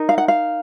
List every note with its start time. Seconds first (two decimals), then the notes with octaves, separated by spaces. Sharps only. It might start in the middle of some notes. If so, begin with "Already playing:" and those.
Already playing: D#4 A#4
0.09 F5
0.18 F#5
0.28 F5